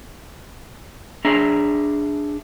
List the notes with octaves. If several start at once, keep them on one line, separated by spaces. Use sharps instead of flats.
D4 G#4 E5 A#5